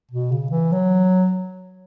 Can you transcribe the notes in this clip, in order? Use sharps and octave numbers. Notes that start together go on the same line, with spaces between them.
B2
C#3
E3
F#3